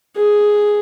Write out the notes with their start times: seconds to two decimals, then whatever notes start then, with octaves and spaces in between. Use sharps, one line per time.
0.17 G#4